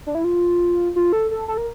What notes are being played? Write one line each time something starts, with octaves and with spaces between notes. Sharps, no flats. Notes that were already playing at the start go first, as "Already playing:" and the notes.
D4
E4
F4
F4
A4
A4
A4
A#4